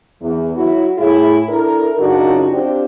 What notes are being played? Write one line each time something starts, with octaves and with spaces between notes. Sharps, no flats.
E2
F#3 E4 F#4
A2 E4 G#4
D4 E4 A4 A#4
F#2 C#3 D4 D#4 F4 F#4
C4 D4 F4 G4